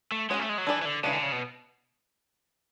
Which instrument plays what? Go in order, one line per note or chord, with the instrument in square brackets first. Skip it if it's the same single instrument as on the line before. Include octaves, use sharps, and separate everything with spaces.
[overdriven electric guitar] A3
[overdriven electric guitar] G#3 [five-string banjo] C#4 F#4 C#5
[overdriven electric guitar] A3
G#3
F#3
[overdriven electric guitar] E3 [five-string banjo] D4 G#4 D5
[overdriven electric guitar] E3
D3
[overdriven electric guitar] C#3 [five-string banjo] E3 G#3 D4
[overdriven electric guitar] D3
C#3
B2